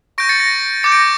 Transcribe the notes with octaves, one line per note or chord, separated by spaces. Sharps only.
C#6 G6 A#6 D7
A6 C#7
A#6
D6 G6 A6 C#7
A#6 D7